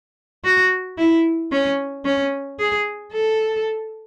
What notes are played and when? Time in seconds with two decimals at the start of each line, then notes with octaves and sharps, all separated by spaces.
0.44 F#4
0.98 E4
1.52 C#4
2.05 C#4
2.59 G#4
3.12 A4